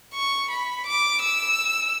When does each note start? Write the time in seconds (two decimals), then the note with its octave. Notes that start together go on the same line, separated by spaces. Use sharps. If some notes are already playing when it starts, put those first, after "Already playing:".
0.15 C#6
0.50 B5
0.87 D6
1.22 E6